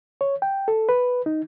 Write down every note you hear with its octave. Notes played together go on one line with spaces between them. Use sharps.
C#5
G5
A4
B4
D#4